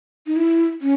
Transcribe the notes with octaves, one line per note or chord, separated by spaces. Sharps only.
D#4
E4
C#4